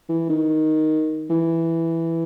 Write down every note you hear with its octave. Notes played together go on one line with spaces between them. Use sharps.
E3
D#3
E3